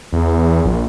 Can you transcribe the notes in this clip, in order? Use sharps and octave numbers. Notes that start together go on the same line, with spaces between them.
E2
A#1